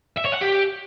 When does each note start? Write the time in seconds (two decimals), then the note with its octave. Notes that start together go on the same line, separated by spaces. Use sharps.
0.17 E5
0.25 C#5
0.33 F#5
0.41 G4